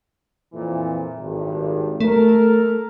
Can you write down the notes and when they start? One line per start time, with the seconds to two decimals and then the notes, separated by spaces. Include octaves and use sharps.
0.53 F2 A#2 E3
1.18 G#1 G2
2.00 A3 A4 A#4